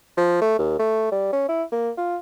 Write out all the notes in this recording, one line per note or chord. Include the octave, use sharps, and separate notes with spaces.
F3
A3
D#2
A3
G3
C#4
E4
A#3
F4